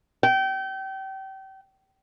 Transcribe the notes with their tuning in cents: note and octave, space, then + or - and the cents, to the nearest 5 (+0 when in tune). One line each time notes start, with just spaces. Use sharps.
G5 -30